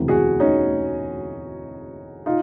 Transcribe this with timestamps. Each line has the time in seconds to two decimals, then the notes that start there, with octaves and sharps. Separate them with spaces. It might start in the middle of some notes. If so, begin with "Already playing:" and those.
Already playing: E1 D2 C3 E3
0.08 F#4 G#4
0.40 C#4 D#4
2.26 D#4 F4